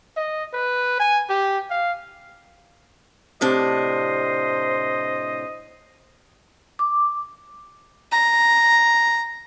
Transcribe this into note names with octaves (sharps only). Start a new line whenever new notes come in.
D#5
B4
G#5
G4
F5
A2 C3 D4 C5 D#5
D6
A#5